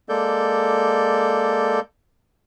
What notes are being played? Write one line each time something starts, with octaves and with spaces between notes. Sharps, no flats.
G#3 A#3 A4 D5 G6